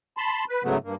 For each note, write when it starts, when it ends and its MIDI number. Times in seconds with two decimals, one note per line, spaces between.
0.17 0.45 81
0.17 0.45 83
0.17 0.45 84
0.49 0.63 71
0.64 0.78 44
0.64 0.78 49
0.64 0.78 54
0.64 0.78 57
0.64 0.78 59
0.84 0.95 43
0.84 0.95 58